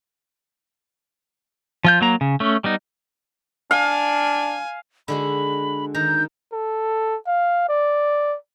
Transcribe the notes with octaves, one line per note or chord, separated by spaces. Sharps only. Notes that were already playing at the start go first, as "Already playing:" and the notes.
F3 F4 G6
F#3 A#3 A#5
C#3
A3 C#4
G3 B3 D#4
D4 F5 G#5
D3 G#3 F#4 B5
D#3 A#5 G6
A4
F5
D5